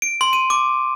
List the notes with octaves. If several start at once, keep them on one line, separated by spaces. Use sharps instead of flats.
D7
C6
D#7
D6